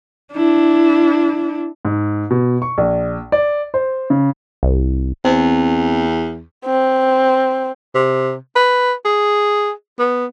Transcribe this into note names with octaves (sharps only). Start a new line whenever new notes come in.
D4 E4
G#2
B2
C#6
A#1
D5
C5
C#3
C2
E2 C4
C4
C3
B4
G#4
B3